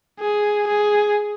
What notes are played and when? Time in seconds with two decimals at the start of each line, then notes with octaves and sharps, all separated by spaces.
0.20 G#4
0.68 G#4